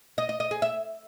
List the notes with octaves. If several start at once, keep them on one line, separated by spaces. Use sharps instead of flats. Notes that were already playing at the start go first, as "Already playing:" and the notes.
D#5
D#5
D#5
G#4
E5